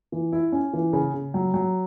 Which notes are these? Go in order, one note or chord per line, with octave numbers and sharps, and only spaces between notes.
E3
E4
C#4
E3
C#3
C#3
F#3
F#3